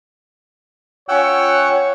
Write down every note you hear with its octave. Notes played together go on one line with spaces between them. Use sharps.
C#4 F4 C#5 F#5 G5 E6